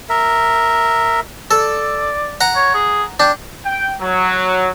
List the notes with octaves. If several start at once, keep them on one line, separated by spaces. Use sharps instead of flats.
A#4 E5
A4 D5
F#5 A#5
C#5
G#4
D4 G5
G5
F#3